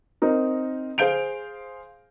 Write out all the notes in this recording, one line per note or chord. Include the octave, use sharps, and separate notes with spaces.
C4 D#4 A#4
G#4 C5 F5 G6 D7 F7